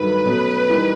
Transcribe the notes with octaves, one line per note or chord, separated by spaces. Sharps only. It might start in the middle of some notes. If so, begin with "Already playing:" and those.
Already playing: G2 D#3 F#3 A3 B4
B2 F#3 A3 C#4
E3 G3 A#3 D#4